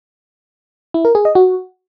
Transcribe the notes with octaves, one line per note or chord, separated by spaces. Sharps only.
E4
A#4
G#4
D#5
F#4